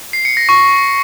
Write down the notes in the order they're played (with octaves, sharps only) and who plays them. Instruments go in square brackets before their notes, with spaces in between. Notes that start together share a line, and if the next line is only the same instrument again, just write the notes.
[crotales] C7
C#7
A#6
C#6